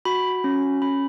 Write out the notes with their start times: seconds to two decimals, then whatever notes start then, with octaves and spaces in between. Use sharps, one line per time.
0.05 F#4 B5
0.44 C#4
0.82 C#4 B5